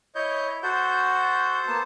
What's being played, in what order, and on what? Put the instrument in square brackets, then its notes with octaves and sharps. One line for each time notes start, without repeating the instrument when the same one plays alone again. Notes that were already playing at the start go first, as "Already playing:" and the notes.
[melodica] E4 [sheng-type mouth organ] C#5 D#5 G6
[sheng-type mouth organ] F#4 F#5 G6 [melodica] A4 C5
[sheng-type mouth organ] A#3 B3 A5